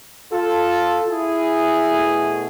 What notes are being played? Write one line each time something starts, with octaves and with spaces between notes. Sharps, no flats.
F4 A4
E4 G#4
B2 A3